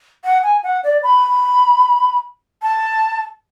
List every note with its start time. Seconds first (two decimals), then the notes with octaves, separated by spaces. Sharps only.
0.24 F#5
0.43 G#5
0.63 F#5
0.84 D5
1.03 B5
2.62 A5